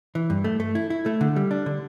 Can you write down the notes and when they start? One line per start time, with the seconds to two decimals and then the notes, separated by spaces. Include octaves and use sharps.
0.15 E3
0.30 G2
0.44 A3
0.60 A3
0.75 E4
0.90 E4
1.06 A3
1.21 D3
1.36 G3
1.51 D4
1.66 D3